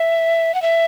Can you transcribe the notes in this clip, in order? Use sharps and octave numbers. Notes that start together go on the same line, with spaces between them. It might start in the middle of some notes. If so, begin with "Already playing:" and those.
Already playing: E5
F#5
E5